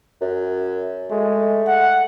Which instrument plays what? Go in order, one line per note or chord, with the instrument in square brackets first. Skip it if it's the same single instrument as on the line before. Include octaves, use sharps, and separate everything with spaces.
[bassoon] F#2
[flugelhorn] G#3 [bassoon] A3
[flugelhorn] F#5